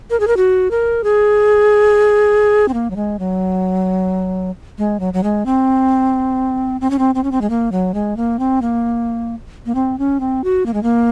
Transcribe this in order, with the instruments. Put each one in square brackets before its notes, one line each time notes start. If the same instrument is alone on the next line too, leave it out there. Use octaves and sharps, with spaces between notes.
[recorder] A#4
G#4
A#4
F#4
A#4
G#4
C4
A#3
F#3
G#3
F#3
G#3
F#3
F#3
G#3
C4
C4
C#4
C4
C4
C#4
C4
G#3
A#3
F#3
G#3
A#3
C4
A#3
A#3
C4
C#4
C4
F#4
A#3
G#3
A#3